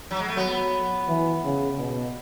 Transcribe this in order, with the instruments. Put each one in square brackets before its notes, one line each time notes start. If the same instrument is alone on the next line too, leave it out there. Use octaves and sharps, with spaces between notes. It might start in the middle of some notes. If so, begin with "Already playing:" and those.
[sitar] F#3
G#3
A3
[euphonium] F#3 [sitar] B3
[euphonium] E3
C#3
B2